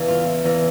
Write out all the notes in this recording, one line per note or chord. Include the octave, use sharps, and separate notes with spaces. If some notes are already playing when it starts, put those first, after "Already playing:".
Already playing: E2 C#3 E3
F4
E4
E2 C#3 E3